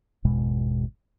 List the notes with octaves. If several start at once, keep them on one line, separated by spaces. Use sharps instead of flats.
G#1 E2 B2 G#3